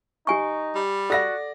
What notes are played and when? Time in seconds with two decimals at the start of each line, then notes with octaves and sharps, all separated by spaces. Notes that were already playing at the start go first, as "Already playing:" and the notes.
0.27 D#4 G4 G#5 C#6
0.76 G3
1.10 F#4 A4 D5 F#5 A#6